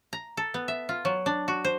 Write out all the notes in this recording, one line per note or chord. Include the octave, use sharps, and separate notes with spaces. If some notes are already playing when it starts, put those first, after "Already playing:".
A#5
A4
B3
E5
F4
F#3
D4
F#4
C5